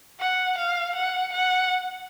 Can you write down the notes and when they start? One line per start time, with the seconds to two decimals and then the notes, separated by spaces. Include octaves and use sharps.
0.20 F#5
0.58 F5
0.96 F#5
1.33 F#5